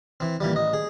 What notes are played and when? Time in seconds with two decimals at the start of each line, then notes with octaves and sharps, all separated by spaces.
0.20 E3 C4
0.40 A#2 E3 G3
0.53 A1 D#5
0.73 G#4